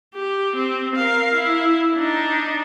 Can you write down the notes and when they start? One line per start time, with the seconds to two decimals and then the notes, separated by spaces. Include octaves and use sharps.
0.14 G4
0.56 C4
0.96 A#4 F5
1.33 E4
1.95 D4 D#4